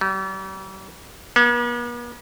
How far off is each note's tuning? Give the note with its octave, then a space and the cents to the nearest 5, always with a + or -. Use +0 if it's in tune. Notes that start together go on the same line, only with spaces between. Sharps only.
G3 -40
B3 -45